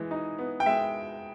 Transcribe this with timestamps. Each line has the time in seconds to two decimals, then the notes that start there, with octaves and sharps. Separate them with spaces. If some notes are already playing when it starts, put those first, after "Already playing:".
Already playing: E3 G#3
0.11 D#4
0.38 B3
0.60 G5
0.66 G#3 E5